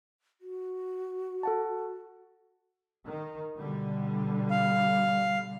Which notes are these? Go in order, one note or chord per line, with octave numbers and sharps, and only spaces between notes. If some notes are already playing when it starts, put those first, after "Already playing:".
F#4
A4 F#5 A5
D#3
B2 D3 G3
F5